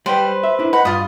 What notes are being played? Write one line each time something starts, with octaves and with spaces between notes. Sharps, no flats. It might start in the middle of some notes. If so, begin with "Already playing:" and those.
G3 B4 C5 G5
E5
D4 E4
D#4 B4 F#5 B5
G2 F4 D#6